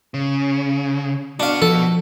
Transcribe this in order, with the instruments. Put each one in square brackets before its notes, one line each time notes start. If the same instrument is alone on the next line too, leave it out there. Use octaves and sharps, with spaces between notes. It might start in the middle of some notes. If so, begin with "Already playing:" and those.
[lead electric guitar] C#3
[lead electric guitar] B3 F#4 [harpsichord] D4 F5
[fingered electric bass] F3 [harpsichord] A4